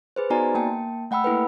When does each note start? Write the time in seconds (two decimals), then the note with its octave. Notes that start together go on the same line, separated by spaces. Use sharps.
0.16 G#4 B4 C5
0.30 B3 D#4 F#4 D5 G#5 A#5
0.55 A#3 G5 A5
1.11 A3 F#5 G5 B5 E6
1.24 A#3 E4 A4 B4